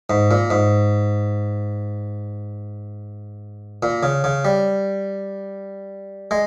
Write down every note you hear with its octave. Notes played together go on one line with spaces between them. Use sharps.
G#2
A#2
G#2
A#2
C#3
C#3
G3
G#3